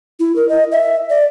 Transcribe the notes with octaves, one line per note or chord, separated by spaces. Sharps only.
E4
A#4
D#5
E5
D5